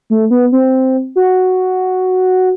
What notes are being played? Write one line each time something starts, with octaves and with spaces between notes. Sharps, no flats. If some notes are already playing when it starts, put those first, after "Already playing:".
A3
B3
C4
F#4